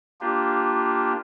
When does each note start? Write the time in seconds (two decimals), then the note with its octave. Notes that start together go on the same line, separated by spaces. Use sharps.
0.21 A#3 D4 F4 G4